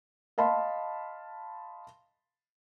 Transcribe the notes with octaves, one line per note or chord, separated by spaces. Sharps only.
D#5 F5 A5 B5 C6